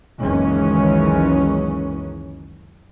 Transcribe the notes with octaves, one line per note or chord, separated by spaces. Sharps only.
F#1 C#2 D#3 E3 G#3 C#4